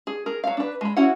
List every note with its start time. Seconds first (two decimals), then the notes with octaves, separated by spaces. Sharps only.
0.07 G#4
0.26 G#4 A#4
0.44 F#3 F5
0.57 D4 B4
0.81 G#3 B5
0.97 C#4 E4 F#4 F#5